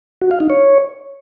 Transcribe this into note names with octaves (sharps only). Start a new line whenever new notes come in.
F#4
F5
D#4
C#5